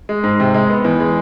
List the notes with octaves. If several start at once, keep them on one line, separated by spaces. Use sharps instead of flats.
G#3
G#2
C3
G#3
B3
E2
G#3